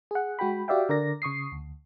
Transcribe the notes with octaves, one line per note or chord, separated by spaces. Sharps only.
G#4 F#5
G#3 F#4 G5 B5
F#4 G4 D5 E5 F5 G5
D3 A#4 D5 A#6
C#3 C#6 D#6 C7
D2